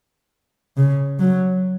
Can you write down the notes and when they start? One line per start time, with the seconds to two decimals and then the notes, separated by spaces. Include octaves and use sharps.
0.77 C#3
1.19 F#3